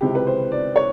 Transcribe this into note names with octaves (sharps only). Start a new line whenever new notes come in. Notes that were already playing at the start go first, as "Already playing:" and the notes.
C#2 C3 E3 G4
B4
C5
D5
C#5